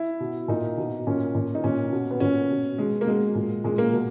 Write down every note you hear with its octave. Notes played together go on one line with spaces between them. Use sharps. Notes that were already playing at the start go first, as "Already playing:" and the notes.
Already playing: E4
B2
A#2 D#4
B2
A#2 C#4
A#2
D#4
A#2 C#4
B2
B3
A#2 C#4
B2
B2 G#3
A#3
B2 G#3
A#2
A#2 G#3
A#3
B2